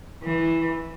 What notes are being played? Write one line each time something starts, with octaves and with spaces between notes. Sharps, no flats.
E3